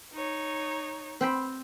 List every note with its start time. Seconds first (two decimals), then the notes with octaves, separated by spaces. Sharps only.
0.13 D#4 C#5
1.21 C4 G5 B5